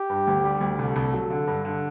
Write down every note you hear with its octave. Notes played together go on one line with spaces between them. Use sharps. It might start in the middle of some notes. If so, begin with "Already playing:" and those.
Already playing: G4
G2
D2
G3
D2
C2 A4
C2
F#3
D3
G2
D3